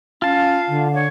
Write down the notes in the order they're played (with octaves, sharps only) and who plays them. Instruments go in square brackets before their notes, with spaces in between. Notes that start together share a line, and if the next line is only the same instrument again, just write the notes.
[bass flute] C#4 [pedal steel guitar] F4 A5 [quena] F5
[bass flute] D3
[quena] C#5